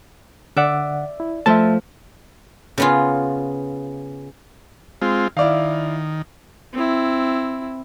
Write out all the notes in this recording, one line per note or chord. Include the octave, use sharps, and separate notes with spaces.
D3 D5 E5 F#5
E4
F3 A3 E5 A5
C#3 B3 F4
G#3 C4 F4
D#3 E4 D5 F5
C4 E4